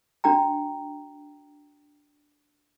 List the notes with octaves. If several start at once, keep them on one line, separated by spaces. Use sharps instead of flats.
D4 F#4 G5 A#5